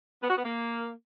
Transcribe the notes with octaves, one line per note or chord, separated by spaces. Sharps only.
B3
F#4
B3
A#3